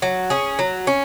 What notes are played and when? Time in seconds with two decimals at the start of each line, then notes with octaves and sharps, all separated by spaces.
0.02 F#3
0.30 C#4 G#4
0.59 F#3
0.87 C#4